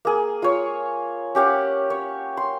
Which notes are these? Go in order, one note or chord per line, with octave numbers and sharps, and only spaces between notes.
A#3 G#4
F4 C#5
C#4 G4 F5 F#5
C#5
C6